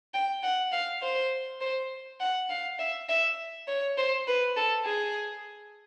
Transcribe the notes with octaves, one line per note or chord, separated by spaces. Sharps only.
G5
F#5
F5
C5
C5
F#5
F5
E5
E5
C#5
C5
B4
A4
G#4